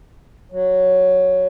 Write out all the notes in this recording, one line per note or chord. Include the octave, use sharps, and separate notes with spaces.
F#3